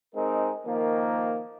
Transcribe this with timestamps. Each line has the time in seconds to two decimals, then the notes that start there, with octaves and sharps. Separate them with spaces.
0.14 G#3 C4 D#4 A#4
0.65 D#3 F3 A#3